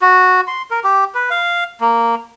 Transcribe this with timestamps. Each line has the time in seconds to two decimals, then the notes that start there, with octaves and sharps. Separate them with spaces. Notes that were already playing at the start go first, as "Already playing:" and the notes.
0.02 F#4
0.48 C6
0.71 A#4
0.84 G4
1.15 B4
1.30 F5
1.81 A#3